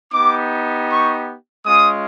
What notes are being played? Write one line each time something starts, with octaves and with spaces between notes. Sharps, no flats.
B3 D#4 G4 D6
C#6
G#3 C#4 F4 D#6